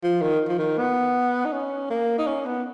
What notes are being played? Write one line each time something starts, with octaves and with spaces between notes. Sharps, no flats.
F3
D#3
F3
D#3
B3
D#4
C#4
A#3
D#4
C#4
B3